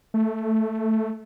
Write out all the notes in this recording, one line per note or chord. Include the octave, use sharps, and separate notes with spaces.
A3